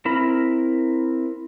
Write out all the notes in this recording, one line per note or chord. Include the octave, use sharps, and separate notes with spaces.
C4 E4 A#4 A#5 B5